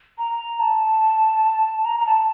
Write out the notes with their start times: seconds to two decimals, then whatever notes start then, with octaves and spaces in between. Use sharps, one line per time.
0.18 A#5
0.60 A5
1.85 A#5
2.00 A#5
2.06 A5